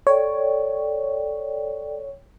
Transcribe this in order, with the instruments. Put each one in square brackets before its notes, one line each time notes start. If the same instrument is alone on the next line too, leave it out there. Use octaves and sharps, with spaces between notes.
[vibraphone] A4 D5 G5 [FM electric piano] C#5